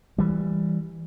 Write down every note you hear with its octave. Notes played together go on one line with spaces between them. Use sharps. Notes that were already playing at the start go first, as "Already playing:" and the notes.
E3 G3